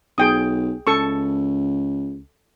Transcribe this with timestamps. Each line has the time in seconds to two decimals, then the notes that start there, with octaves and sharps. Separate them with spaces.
0.18 B1 G#4 G5 D#6
0.87 C#2 A4 C#6